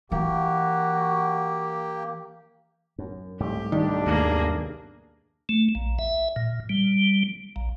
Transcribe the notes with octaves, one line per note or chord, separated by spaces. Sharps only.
E3 A#3 F#4 G4
F#2
C2 G#2 A3 G4
B1 D#3 G3 D4
D#2 A#3 G#4
A3
A#1
E5
A#2
G3
A#1